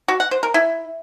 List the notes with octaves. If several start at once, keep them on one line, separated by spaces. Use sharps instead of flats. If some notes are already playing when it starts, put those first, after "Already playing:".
F#4
F#5
C5
A#4
E4